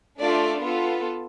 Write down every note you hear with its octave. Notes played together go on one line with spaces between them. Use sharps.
A3 D4 F4 A4 D5
B3 F4 A4